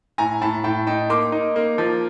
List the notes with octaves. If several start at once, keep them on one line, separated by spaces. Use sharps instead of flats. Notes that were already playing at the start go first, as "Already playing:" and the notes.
A2 G#5 A#5
A2 A5 B5
A2 G5 A5
D#4 G5 A5
A#3 C6 D6
D#4
A#3
F3